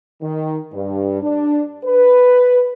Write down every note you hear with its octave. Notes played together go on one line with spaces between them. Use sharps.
D#3
G2
D4
B4